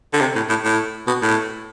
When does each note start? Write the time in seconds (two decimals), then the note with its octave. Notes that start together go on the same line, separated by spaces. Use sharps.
0.13 D3
0.20 C3
0.35 A2
0.49 A2
0.64 A2
1.07 B2
1.22 A2